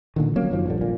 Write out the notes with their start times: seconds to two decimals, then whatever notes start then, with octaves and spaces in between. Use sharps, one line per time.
0.16 A#2 D3 D#3
0.36 F#3 A#3 C#4
0.50 F#1 F#2 D#3 F3
0.66 A#1 G2 D3
0.81 A#2